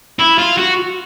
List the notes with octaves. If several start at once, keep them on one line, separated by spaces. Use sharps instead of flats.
E4
F4
F#4